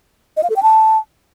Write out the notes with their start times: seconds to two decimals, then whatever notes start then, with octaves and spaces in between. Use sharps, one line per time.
0.37 D#5
0.43 F5
0.50 A4
0.56 G5
0.63 A5